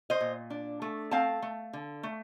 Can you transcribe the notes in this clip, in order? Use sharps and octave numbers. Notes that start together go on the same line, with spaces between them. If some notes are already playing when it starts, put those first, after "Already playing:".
C5 D#5
A#2
D4
A3
C4 F5 A5
A3
D3
A3